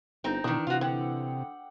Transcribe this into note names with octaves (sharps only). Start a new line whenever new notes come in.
G1 C4 D#4
B2 D#3 E3 D4 D#6
C3 F4 F#4
D3 F#5 G5